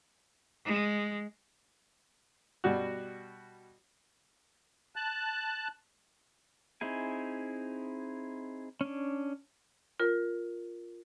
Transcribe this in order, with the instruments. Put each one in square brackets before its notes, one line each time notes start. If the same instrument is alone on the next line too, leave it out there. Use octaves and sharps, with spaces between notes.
[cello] G#3
[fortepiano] B2 G3 F#4
[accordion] A5 F#6
[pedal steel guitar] C4 D#4 E4 G#4 G#5
C#4 D4
[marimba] F4 A#4